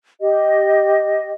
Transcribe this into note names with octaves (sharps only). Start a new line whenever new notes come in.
G4 D#5